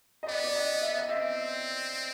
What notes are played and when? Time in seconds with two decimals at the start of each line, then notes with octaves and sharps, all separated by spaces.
0.23 D#5
0.27 B3 D5
0.44 D5
0.55 D#5
0.82 E5
0.98 D#5
1.09 C4 E5